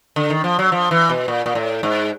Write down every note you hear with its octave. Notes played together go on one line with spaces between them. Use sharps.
D3
D#3
F3
F#3
F3
E3
B2
A#2
A#2
A2
G#2